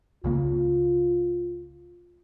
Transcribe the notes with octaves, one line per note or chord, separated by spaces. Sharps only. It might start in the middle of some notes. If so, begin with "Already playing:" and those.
C#2 C#3 A#3 F4